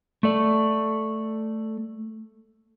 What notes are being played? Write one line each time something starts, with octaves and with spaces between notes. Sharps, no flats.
A3 A4 D5